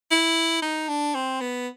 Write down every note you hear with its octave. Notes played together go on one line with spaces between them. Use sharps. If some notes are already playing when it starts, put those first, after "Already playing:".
E4
D#4
D4
C4
B3